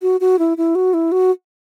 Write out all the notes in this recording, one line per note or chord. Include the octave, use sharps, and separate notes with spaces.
F#4
F#4
E4
E4
F#4
E4
F#4